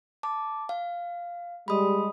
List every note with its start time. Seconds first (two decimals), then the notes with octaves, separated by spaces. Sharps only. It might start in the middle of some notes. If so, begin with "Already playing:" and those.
0.23 A5 D6
0.69 F5
1.68 G3 G#3 B5 D#6